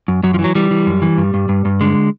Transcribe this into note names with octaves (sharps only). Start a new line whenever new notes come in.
F#2
F#2 F#3
F3
E3
F#3
E3 G3
E3
F#2
E3
G2
G2
G2
G2
D3 G#3